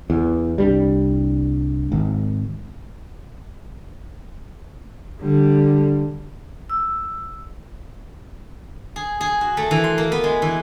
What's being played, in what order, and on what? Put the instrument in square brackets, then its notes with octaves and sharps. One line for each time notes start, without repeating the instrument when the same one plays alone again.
[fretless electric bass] E2
C2 G2 G3
G#1
[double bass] D3 G3
[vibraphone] E6
[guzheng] G#4
G#4
F#4
A3
E3
C6
A#3
B3
G#3
E3